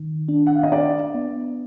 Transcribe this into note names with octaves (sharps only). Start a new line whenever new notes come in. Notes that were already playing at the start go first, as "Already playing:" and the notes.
Already playing: D#3
D4
F#5
F5
D#5
D4 D5
B3